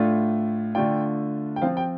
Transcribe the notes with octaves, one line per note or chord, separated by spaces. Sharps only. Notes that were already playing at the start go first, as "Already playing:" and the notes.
Already playing: A2 A3 D4 F4
D3 A3 D4 F4 G5
G5
F3 C4 F4 F5
G5